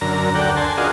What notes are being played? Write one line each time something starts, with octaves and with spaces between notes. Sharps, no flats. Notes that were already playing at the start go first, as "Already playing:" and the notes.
F#2 D3 A#4 A#5
D2 A4 D5 F#5 G5
G#5 A5 C6
D4 F4 F#4 G#4 A#4 D#5